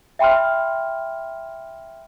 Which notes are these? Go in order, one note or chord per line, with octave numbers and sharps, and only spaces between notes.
E5 G5 B5 C6 F6